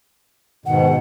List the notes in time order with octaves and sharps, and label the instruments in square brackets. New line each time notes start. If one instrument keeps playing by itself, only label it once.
[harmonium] G#2 B2 D#3 [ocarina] F#5